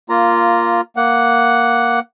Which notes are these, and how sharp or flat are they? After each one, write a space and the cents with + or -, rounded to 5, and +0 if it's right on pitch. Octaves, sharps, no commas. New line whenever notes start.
A#3 +0 F4 -5 A#5 +0
A#3 +0 F#5 +0